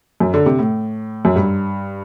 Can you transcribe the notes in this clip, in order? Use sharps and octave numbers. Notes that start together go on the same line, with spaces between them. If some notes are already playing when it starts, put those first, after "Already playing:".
F#2
D3
C3
A2
F#2
G2